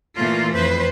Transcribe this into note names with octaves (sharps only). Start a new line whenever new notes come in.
A#2 E3 A3 A#3 F4
F2 B4 C5